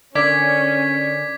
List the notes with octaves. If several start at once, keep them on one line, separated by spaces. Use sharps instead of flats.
D3 C#4 A#4 D5 D6 G#6 B6